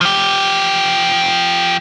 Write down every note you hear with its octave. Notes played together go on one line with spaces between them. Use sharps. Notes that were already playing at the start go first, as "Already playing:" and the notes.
F3 G4